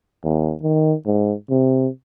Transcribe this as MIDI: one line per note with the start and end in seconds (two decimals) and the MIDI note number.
0.24 0.54 39
0.62 0.94 51
1.06 1.33 44
1.50 1.88 48